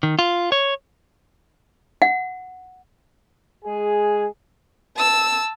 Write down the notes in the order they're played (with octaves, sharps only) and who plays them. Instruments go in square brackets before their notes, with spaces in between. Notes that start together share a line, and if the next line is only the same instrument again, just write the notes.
[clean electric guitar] D#3
F4
C#5
[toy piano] F#5
[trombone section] G#3 G#4
[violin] A5 E6